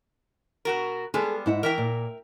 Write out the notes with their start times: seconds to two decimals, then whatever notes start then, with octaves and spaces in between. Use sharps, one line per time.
0.65 B2 F#4 A#4
1.14 G3 G#3 B3 G#4 A4
1.46 G#2 E4 F#5
1.63 E3 A#4 E5 G5
1.78 A#2